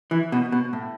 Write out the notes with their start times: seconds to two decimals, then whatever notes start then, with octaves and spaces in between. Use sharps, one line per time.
0.11 E3
0.32 B2
0.52 B2
0.73 A2